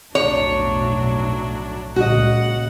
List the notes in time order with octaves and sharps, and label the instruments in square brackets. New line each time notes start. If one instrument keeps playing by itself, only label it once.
[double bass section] F1 B1 [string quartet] A2 F#3 D4 [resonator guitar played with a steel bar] C#5
[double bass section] C#2 A#2 C#3 [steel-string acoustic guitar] F#4 D#5 [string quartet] F#5